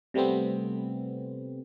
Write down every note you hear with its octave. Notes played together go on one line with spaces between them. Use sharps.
C3 G3 A3 B3 C4